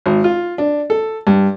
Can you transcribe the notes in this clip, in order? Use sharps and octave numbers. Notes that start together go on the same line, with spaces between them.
G#1
F4
D4
A4
G2